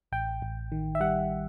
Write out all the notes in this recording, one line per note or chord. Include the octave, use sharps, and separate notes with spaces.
A1 G5
A1
D#3
E5
G3 F#5